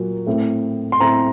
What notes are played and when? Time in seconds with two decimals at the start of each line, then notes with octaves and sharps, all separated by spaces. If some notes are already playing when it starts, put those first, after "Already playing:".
Already playing: A#2 F#3 A#3
0.27 A2 A3 C4
0.92 C6
1.01 A2 A3 C4 A#5